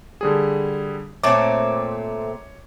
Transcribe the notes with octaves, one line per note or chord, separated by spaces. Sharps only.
D3 G3 G#4
A#2 A3 C4 C#5 D6